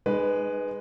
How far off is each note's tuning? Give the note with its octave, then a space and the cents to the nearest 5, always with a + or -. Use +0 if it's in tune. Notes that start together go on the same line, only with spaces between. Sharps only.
G#3 +0 D#4 -35 B4 +5